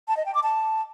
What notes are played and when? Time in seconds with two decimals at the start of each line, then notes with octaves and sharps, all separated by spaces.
0.08 A5
0.17 D#5
0.26 G5
0.34 D6
0.43 A5